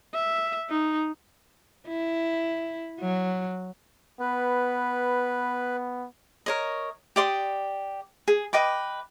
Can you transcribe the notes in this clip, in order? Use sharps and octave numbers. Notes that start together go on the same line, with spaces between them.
E5
D#4
E4
F#3
B3 B4
A#4 C#5 D#5
G4 D5 C6 D#6
G#4
B4 D#5 G5 D6